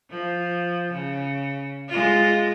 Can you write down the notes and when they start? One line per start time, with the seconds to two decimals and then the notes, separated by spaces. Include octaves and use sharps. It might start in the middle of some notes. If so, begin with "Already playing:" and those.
0.10 F3
0.93 C#3
1.88 G#3 F4